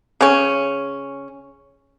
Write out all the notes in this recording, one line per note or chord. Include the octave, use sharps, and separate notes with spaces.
C#3 C#4